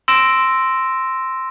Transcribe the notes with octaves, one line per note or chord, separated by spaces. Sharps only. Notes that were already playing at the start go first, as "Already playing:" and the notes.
C6 E6 A#6 D7 E7